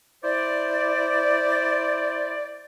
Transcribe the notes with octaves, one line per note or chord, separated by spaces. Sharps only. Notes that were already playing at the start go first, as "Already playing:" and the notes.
E4 C5 D5